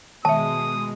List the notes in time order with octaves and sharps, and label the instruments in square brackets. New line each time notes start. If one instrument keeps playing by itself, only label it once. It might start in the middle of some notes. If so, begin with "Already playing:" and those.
[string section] B2 G#3 [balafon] D#3 E5 [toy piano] A5 [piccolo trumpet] D#6